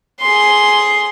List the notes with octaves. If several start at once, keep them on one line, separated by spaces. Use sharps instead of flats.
G#4 C6